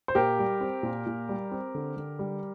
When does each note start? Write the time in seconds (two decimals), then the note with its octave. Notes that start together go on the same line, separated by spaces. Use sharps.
0.08 C5
0.15 A#2 G4 A#4
0.39 G3
0.61 C4
0.83 A#2
1.06 A#2
1.29 G3
1.51 C4
1.75 D3
1.97 D3
2.19 G3